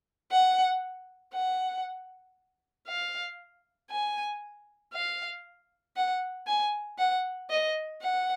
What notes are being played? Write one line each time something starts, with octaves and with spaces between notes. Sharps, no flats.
F#5
F#5
F5
G#5
F5
F#5
G#5
F#5
D#5
F#5